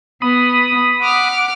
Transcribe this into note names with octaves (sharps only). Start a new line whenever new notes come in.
B3 B5 D#6
F#5 D6 F6